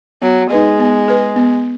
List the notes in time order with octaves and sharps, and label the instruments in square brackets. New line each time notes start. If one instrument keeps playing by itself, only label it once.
[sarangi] F#3 [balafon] B3
[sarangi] G#3 [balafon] D#4 B4 D#5
[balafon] B3
G#4 B4
B3